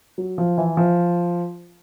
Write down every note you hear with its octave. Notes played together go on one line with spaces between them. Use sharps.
F#3
F3
E3
F3